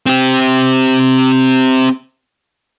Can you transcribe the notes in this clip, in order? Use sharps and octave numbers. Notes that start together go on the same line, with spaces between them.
C4 G4